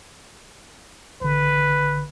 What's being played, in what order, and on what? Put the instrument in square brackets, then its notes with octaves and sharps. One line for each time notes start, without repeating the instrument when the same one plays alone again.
[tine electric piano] A1 D3 [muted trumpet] B4